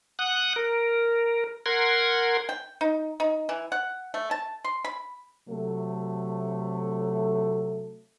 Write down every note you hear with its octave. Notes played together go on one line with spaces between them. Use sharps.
F#5 D#6 F#6
A#4
A#4 F#5 C6 G#6
G5
D#4
D#4
E3
F#5
A3
A5
C6
B5
C3 F#3 A3